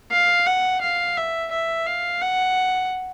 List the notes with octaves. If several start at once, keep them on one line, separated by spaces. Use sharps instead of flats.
F5
F#5
F5
E5
E5
F5
F#5